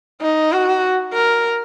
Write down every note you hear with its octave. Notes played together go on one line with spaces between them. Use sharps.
D#4
F#4
A#4